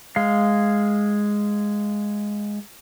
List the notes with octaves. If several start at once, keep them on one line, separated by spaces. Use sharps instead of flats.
G#3 F5